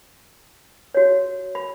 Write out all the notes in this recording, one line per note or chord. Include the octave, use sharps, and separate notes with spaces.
F#4 C#5
B5